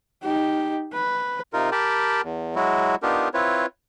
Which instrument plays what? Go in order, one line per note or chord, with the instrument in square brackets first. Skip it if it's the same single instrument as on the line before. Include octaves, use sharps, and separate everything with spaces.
[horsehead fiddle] D#4 G4
B4
[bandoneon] C3 D#4 F4 A#4
G4 A#4 G5 A5 B5
E2
F#3 G#3 E4 F#4
B3 D4 D#4 F4 G4 A#4
C4 E4 F4 B4 C#5